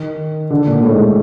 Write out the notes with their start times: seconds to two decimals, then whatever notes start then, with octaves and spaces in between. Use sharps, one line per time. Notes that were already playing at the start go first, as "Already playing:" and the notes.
Already playing: D#3
0.50 D3
0.67 A#2
0.83 A2
0.90 G#2